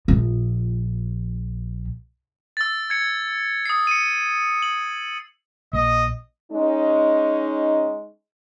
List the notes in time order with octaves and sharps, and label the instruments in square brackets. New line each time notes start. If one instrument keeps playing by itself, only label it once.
[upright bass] A#1 F3
[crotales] E6 A6
G#6 C#7
D#6 C7
C#7 D#7
F#7
[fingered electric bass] A#1 [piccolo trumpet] D#5
[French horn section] G#3 C#4 D#4